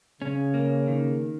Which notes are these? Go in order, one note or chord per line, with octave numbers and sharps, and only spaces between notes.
C#3 C#4
A#3
D#3